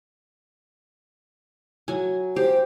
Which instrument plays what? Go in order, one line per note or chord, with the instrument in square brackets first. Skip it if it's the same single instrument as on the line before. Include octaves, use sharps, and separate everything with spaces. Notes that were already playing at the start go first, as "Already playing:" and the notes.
[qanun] F#3 G#5
[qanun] G4 [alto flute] C5